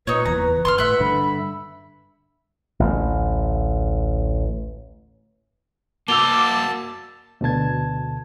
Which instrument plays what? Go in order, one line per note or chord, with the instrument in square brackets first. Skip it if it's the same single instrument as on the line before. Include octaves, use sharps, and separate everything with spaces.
[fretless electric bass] A#2 [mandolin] D#4 C#5 [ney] B4
[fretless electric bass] F#1 E2 E3 [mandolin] A#5
[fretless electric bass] G1 [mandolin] C6 C#6 F6
[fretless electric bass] A2 [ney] B4 [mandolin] E5 F#5
[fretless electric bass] G2 D3 [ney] B5
[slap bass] A1 D2
[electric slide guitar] A#3 F#4 [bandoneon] A5 [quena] D6 [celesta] E6 F7 G7
[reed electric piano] D2 B2 D3 A5 G#6